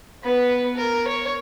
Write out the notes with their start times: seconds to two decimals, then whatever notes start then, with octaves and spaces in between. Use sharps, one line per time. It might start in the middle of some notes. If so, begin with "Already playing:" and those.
0.23 B3 B4
0.76 A#4
1.07 C#5